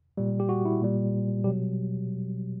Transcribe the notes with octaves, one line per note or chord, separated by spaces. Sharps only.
A#2 G3
G4
F#4
E4
A#2 G3
B2 F#3 G3 G4